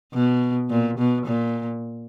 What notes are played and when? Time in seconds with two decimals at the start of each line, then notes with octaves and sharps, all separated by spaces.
0.14 B2
0.71 A#2
0.98 B2
1.26 A#2